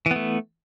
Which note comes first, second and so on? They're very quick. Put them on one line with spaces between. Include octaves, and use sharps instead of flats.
E3 B3 A3